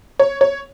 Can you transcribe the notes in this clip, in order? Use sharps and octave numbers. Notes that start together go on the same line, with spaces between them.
C#5
C#5